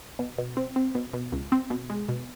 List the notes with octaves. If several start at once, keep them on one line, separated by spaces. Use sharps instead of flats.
B2
B2
C4
C4
B2
B2
C#2
C4
B2
G#3
B2